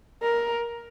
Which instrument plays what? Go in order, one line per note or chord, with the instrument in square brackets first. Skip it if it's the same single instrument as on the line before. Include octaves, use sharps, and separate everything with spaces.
[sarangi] A#4